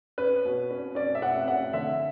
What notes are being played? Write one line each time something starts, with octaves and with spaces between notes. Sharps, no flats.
C#4 B4
B2
C#4
C#4 D5
E5
C#4 F#5
C#4 F#5
D3 E5